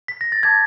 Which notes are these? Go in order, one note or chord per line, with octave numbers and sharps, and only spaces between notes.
B6
A#6
A6
A5 D6 G6 G#6